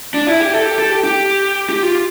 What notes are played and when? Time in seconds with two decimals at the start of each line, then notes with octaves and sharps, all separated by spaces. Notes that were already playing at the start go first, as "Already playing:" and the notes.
0.14 D4
0.27 E4
0.41 G4
0.54 A4
0.65 G4
0.79 A4
0.92 G4
1.05 G4
1.69 G4
1.83 F4